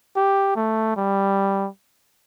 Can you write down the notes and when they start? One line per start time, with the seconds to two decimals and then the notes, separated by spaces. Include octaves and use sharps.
0.16 G4
0.56 A3
0.96 G3